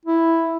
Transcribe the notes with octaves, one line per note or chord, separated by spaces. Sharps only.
E4